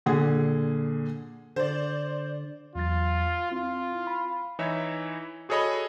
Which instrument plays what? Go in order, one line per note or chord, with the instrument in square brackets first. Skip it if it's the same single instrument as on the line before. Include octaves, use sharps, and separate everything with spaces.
[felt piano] A#2 D3 G#4
[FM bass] D3 [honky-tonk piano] C5 D5
[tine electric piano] E2 F#3 A6 [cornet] F4
[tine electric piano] C4 E4 [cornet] F4
[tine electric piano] B5
[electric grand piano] E3 D#4 E4 C#5 E5 E6
F#4 G#4 A4 C#5 D#5 B5